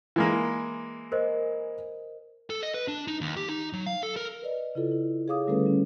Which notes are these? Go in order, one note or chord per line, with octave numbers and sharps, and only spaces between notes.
E3 G#3 A#3
A#4 C5 D#5
A4
D#5
B4
D4
D#4
D#2
G4
D#4
F#3
F5
A4
A#4
B4 D5 D#5
C#3 E4 F4 A4
E4
G#4 C#5 F5 D6 D#6
D3 G3 A3 C#4 A4 B4
G3 C#4